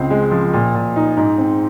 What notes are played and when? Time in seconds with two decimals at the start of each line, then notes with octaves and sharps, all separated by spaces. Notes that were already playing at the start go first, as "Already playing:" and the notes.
Already playing: C#2 C4
0.10 G#3
0.31 F3
0.53 A#2
0.74 A#2
0.96 D#4
1.17 G#2
1.37 C4